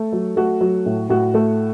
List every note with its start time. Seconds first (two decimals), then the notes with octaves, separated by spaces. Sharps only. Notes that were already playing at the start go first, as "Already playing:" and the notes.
Already playing: A3
0.13 F#3
0.36 A3 F#4
0.61 F#3
0.86 A2
1.09 A2 F#4
1.34 A3